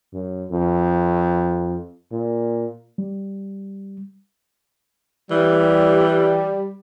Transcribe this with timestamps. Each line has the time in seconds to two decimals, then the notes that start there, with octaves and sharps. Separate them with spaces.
0.13 F#2
0.51 F2
2.12 A#2
2.98 G3
5.31 E3 G3